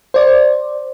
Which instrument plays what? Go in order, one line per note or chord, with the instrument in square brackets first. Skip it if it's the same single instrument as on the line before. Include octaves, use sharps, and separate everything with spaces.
[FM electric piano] C5 D5